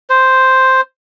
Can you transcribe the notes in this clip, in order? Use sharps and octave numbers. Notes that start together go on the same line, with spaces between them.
C5